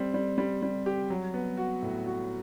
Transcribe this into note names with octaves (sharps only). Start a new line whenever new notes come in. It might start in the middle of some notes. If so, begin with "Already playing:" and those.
Already playing: G3 C4
G3
G3
G3
G4
F#3
B3
F#4
A2
F#4